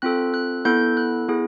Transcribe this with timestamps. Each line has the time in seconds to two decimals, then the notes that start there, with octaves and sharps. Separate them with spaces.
0.02 C4 F4 A4 F#6
0.34 F#6
0.65 B3 E4 A4 G6
0.97 F#6
1.29 B3 E4 G#4